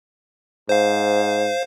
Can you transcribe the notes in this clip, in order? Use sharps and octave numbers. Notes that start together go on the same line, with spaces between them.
G#2 C5 F5